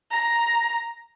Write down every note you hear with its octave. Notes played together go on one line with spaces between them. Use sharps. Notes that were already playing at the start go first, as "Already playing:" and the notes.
A#5